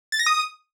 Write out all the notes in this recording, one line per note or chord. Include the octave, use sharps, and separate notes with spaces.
A6
A#6
D#6